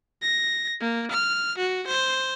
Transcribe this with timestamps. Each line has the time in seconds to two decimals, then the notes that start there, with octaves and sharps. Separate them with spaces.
0.22 A#6
0.81 A#3
1.11 F6
1.58 F#4
1.87 C5